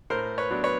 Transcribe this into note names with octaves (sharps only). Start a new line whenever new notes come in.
A2 A#4 C5
B4 C#5
F#3 B3 D4
B4 C#5